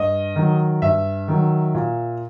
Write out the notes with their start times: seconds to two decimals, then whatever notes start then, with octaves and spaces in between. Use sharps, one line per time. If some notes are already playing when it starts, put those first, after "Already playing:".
Already playing: G2 D#5
0.36 D#3 F#3
0.82 G2 E5
1.28 D#3 F#3
1.75 A#2